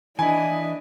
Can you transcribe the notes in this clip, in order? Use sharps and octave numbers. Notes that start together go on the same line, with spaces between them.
E3 D4 E4 D#5 G#5